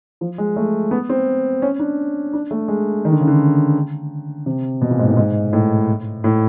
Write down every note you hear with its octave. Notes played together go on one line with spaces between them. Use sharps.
F3
G#3
A3
B3
C4
C#4
D4
D4
A3
G#3
D#3
D3
C#3
D3
C3
B2
A#2
G#2
A2
G#2
A2
A2